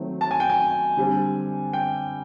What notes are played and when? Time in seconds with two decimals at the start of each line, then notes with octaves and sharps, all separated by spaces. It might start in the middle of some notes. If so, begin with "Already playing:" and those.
Already playing: D#3 F#3 A3 C4
0.21 A5
0.31 G#5
0.40 G5
0.50 G#5
0.97 D3 G3 C4
1.73 G5